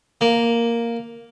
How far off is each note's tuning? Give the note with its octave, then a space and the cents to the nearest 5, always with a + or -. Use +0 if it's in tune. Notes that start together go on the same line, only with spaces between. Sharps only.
A#3 +0